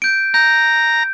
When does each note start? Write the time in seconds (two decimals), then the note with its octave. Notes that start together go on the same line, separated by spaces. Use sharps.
0.02 G6 D7
0.34 A#5 G6